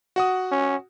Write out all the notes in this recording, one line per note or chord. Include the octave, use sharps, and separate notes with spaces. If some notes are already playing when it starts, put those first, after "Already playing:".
F#4 F#5 D#6
C#4